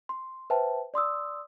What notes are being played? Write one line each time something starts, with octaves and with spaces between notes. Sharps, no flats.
C6
B4 C5 E5 G5 A5
D5 C6 D#6 E6